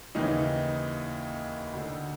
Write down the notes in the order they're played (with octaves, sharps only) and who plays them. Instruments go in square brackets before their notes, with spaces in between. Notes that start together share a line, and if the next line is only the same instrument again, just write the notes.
[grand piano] D#2 C#3 E3 D#4
D2 D3